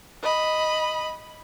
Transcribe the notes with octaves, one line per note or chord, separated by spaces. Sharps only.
D#5 B5